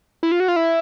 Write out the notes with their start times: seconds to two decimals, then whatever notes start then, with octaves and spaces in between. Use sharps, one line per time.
0.23 E4
0.32 F4
0.40 F#4
0.48 F4
0.56 E4